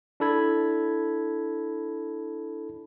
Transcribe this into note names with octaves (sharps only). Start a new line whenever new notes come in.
D4 E4 A4 B5 G#6